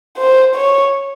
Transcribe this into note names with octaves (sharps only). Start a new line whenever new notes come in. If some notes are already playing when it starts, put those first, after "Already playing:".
C5
C#5